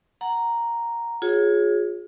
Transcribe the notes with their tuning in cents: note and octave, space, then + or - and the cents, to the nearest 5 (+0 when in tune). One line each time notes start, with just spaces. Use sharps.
F#5 +0 A#5 +0
F4 +35 G#4 +0 C#5 -5